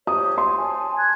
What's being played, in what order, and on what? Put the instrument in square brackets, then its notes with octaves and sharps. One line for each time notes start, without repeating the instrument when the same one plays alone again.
[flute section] G4 C5 C#5 [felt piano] D#6
[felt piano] C6
[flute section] G#5 A5
F#6 G#6